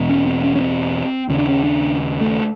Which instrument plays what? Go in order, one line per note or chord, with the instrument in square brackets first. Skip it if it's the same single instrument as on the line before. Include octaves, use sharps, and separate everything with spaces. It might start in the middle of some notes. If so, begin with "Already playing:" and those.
Already playing: [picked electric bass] E2 B2
C#4
C4
C#4
C#4
C4
D#2 C#3 C#4
D4
C#4
D4
A3